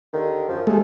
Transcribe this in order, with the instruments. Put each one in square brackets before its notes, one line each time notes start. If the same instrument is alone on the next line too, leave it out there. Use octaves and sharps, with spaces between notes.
[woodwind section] D#2 D3 D#3
F#2 F3
[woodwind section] D#2 [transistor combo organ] G#3 A3